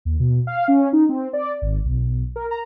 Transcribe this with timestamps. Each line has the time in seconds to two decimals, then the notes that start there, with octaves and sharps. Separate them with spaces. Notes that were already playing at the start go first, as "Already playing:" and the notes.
0.05 D#2
0.20 B2
0.47 F5
0.68 C#4
0.93 D#4
1.09 C4
1.33 D5
1.62 G#1
1.85 B1
2.36 A#4
2.51 A#5